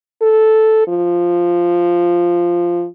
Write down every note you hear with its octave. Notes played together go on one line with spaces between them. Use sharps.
A4
F3